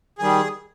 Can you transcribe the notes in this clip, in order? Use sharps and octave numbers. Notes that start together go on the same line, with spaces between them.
D#3 G3 G#4